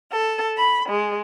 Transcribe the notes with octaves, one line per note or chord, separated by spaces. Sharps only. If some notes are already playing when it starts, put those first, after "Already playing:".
A4
B5
G#3